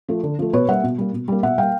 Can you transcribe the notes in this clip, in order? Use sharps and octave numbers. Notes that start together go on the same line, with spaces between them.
F3 A3
D3
F3 A3
B2 B4 C#5
G3 A#3 E5 F#5
B2
G3 A#3
B2
G3 A#3
B2 E5 F#5
G3 A#3 F5 G5